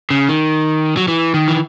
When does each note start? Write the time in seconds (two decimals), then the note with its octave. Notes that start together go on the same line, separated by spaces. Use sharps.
0.10 C#3
0.29 D#3
0.97 F#3
1.08 E3
1.34 D#3
1.48 E3